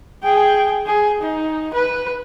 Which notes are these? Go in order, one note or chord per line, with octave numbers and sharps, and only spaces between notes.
G#4 G5
G#4
D#4
B4